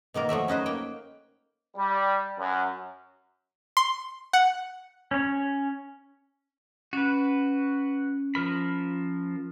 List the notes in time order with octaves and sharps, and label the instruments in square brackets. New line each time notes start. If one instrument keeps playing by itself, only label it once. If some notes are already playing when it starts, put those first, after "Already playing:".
[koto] B2 D#3 A#3 A#4
F3 F#3 A3 E5
C#4 D#4 B4 C5
A#3 G5
[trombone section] G3
F#2
[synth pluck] C6
F#5
[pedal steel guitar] C#4 C#5
[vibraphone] C#4 [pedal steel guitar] F#4 B4
[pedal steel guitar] F3 A#4 B5